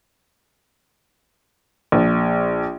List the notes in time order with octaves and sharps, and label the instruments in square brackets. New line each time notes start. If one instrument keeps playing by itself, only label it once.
[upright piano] A#1